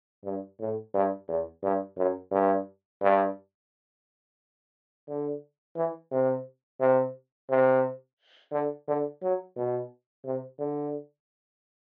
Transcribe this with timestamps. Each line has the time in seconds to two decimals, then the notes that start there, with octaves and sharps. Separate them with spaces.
0.25 G2
0.60 A2
0.94 G2
1.28 E2
1.63 G2
1.97 F#2
2.31 G2
3.02 G2
5.08 D3
5.76 E3
6.12 C3
6.80 C3
7.50 C3
8.52 D3
8.88 D3
9.22 F#3
9.57 B2
10.25 C3
10.59 D3